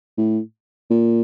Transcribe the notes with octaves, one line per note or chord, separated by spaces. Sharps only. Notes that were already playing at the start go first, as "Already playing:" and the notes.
A2
A#2